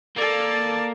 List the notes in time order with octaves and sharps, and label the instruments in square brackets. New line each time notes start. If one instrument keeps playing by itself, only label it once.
[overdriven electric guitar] A#3 [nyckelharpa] A4 [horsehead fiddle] D5 A5